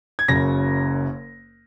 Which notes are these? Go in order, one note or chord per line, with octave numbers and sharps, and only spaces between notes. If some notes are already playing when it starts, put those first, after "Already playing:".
G#6
F#1 F#2 C#3 A#6